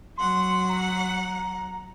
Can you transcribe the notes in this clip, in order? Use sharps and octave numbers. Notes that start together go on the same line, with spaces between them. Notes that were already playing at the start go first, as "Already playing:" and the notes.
F#3 F#5 C6
A#5